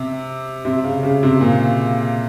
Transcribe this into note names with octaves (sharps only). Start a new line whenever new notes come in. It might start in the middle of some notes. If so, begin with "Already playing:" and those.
Already playing: C3
C3
C#3
C#3
C3
A#2